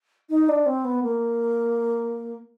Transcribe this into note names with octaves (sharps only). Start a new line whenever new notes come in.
D#4
D4
C4
B3
A#3